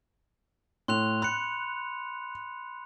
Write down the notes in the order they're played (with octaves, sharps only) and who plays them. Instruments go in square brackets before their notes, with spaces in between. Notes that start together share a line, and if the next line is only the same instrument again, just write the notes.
[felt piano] A2 [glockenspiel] C6 F#6 F7
[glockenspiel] B5 C#7 [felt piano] F#6